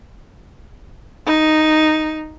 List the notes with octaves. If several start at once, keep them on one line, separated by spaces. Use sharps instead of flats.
D#4